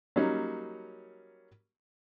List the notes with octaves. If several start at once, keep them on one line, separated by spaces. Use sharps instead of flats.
F#3 G3 A#3 C#4 D#4